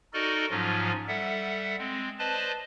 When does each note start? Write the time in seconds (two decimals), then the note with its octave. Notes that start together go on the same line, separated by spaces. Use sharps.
0.13 D#4 F#4 A4 A#4 D5 D#5
0.51 G#2 F3 F#3 C#4 F4
1.08 G3 A4 E5 F#5
1.79 G#3 C4
2.19 B4 C5 D5 D#5 A5